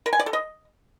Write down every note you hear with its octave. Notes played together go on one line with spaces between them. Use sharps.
A#4
G#5
D5
A4
D#5